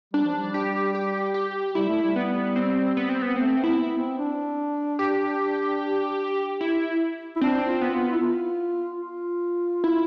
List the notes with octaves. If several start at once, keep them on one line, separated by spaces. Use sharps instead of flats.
G3 D4
F3
G3
G4
G4
G4
G3 E4
A3
G3
B3
C4
B3
C4
B3
A3 C4
B3
E4
B3
C4
D4
G4
E4
E4
C4 D4
F4
B3
F4
E4
F4
F4
E4